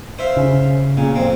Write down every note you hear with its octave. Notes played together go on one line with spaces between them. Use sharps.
C5 E5 F5
C#3
A#2 C#3
F2 C4